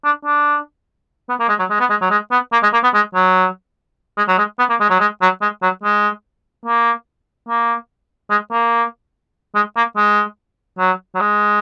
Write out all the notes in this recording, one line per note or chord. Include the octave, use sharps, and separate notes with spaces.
D4
D4
B3
A#3
G#3
F#3
G#3
B3
G#3
F#3
G#3
B3
A#3
G#3
A#3
B3
G#3
F#3
G#3
F#3
G#3
B3
A#3
G#3
F#3
G#3
F#3
G#3
F#3
G#3
A#3
A#3
G#3
A#3
G#3
A#3
G#3
F#3
F#3
G#3